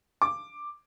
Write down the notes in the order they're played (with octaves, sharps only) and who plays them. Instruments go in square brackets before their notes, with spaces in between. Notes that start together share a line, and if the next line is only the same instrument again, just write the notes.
[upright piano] D6